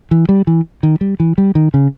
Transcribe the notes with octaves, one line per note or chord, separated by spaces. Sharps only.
E3
G3
E3
D#3
G3
E3
G3
D#3
C#3